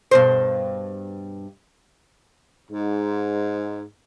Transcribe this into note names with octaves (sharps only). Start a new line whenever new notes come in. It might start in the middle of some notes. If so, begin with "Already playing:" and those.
G2 B2 C5
G#2